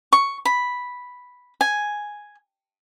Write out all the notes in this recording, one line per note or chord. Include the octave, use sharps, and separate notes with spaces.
C#6
B5
G#5